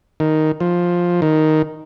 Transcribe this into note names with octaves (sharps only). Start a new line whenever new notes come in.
D#3
F3
D#3